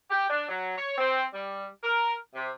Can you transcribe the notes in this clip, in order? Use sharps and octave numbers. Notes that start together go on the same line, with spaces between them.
G4
D4
F#3
C#5
C4
G3
A#4
C3